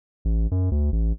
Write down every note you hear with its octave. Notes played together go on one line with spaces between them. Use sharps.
A1
F#2
D2
A1